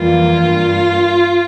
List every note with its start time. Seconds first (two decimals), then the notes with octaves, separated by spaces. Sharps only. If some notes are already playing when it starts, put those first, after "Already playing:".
Already playing: F2 E3 G3 A#3 F4
0.40 G2 G3 A#3